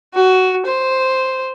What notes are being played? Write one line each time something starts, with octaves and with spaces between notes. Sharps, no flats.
F#4
C5